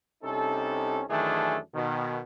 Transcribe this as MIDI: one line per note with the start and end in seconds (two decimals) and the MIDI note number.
0.23 1.04 36
0.23 1.04 48
0.23 1.04 61
0.23 1.04 63
0.23 1.04 69
1.10 1.59 42
1.10 1.59 51
1.10 1.59 52
1.10 1.59 57
1.10 1.59 62
1.10 1.59 68
1.74 2.21 47
1.74 2.21 51